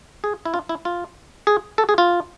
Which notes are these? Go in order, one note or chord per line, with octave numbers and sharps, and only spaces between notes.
G#4
E4
F4
E4
F4
G#4
A4
G#4
F4